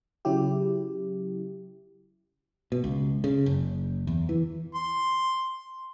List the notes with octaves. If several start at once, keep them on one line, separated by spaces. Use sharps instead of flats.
C#3 F#3 E4 G4
B2
C#2
C#3
F#1
E2
E3
C6